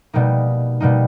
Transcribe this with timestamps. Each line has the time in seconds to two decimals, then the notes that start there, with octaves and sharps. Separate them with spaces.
0.13 B2 G3 A#3 D#4
0.80 B2 G3 A#3 D#4